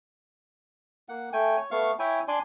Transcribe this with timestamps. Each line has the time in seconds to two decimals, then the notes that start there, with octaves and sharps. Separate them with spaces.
1.09 A#3 F#5
1.33 A3 G5 G#5
1.57 C#5
1.71 A3 B3 F5 C#6
1.99 E4 C#5 G5 G#5
2.28 D4 D5 G#5 C6